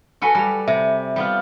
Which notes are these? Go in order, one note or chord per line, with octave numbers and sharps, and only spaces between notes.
F#4 A4 B4 G#5 C#6
G3 B5 D6
C3 E5
G3 B3 F4